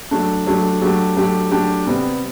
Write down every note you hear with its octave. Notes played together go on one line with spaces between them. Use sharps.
F#3 A3 D4
F#3 A3 D4 G4
F#3 A3 D4 G4
F#3 A3 D4 G4
F#3 A3 D4 G4
C3 G3 B3